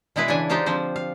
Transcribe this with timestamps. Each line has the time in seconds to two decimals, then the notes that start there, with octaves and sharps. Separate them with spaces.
0.16 B2 G#3 E4 G#4 B4
0.28 C#3 E3 D4 A4 G#5
0.50 G#3 D#4 F4 G4 C5 F5
0.66 D3 F3 C4 C5
0.96 F5